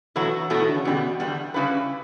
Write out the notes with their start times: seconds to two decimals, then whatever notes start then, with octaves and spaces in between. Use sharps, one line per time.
0.16 B2 E3 F#3 A3 E4
0.50 B2 F#3 A3 E4
0.60 E3
0.68 D3
0.77 C#3
0.85 E2 B2 D3 G3 B3
1.20 E2 D3 G3 B3
1.54 C#3 G3 C#4 E4 B4